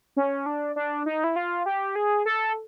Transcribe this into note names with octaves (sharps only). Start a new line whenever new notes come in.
C#4
D4
D4
D#4
E4
F4
G4
G#4
A4